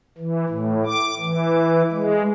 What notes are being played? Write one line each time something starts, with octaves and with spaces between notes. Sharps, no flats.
E3
A2
D6
E3
G#3